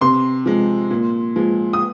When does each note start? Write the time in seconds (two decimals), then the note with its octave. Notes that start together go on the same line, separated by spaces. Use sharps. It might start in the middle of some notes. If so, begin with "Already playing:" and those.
0.01 C3 C6
0.46 F3 G#3
0.91 A#2
1.36 F3 G#3
1.73 D#6